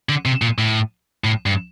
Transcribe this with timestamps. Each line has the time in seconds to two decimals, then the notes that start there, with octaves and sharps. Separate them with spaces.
0.09 D3
0.26 C3
0.42 A#2
0.58 A2
1.24 A2
1.46 G2